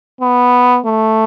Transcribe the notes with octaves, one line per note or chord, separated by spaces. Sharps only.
B3
A3